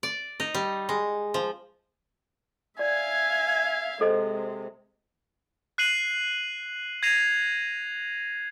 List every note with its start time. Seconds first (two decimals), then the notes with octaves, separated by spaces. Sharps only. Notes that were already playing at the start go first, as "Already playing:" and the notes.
0.03 D5
0.40 D#4
0.54 G3
0.89 G#3
1.34 F3
2.79 D5 E5 F5 G#5 G#6
4.01 C3 G#3 A4 C5 D#5
5.78 F#6 C7 D#7 F#7
7.03 G#6 A#6 C7 D#7 F7